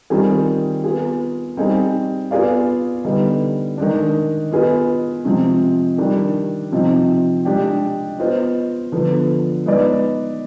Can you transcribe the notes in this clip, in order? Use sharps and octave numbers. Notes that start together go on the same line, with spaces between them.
D#3 G3 C4 F4 G#4
B3 F4 G#4
G3 C4 D#4 G#4
B3 F4 G#4 D5 F5
D3 G3 B3 D#4
D#3 G#3 D4
B3 F4 G#4 B4 D#5
C3 F3 G#3 C4
D#3 G3 D4
C3 F3 C4 D#4
G#3 D4 G4
B3 F4 C5 D#5
D3 F3 B3
G#3 B3 D#4 B4 D5